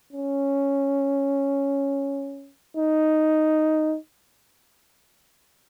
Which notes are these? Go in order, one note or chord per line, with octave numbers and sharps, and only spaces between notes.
C#4
D#4